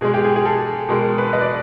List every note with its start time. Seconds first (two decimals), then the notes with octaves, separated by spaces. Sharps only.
0.01 B2 G#3 G#4
0.14 G4
0.25 G#4
0.36 G#4
0.45 A4
0.89 B2 G#3 A#4
1.18 B4
1.33 D#5
1.41 D5